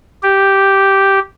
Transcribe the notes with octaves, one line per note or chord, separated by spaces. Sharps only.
G4